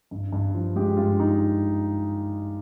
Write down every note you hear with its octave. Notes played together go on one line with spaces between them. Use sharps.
G2
G2
F3
G#3 G4
G2 F4
D#4